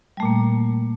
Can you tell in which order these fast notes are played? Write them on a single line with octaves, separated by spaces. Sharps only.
G3 A3 A#2 A#3